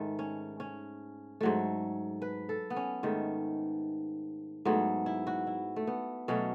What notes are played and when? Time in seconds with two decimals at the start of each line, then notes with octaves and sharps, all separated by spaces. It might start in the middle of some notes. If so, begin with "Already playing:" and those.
Already playing: G#2 D#3 A3
0.19 C#4
0.60 C#4
1.41 G#2 F#3 A3
2.22 B4
2.49 A4
2.70 B3
2.76 C#4
3.03 G#2 D#3 A3
4.65 G#2 F#3 A3 B3
5.06 E4
5.27 F#4
5.47 E4
5.76 A3
5.87 B3
6.28 B2 F#3 A3 C#4